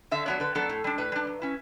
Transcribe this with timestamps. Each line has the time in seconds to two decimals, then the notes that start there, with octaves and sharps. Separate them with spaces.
0.11 D3 E5
0.26 F#3 B3 D4 C#5
0.40 D3 B4
0.55 F#3 B3 D4 A4
0.69 A2
0.84 G3 D4
0.98 A2 B4
1.12 G3 D4
1.27 F#3
1.42 C#4 E4